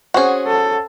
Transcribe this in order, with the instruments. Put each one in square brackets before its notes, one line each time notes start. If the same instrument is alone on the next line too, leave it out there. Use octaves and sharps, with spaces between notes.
[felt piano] C#4 C5 F#5 [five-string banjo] F#4 G#4
[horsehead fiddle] A4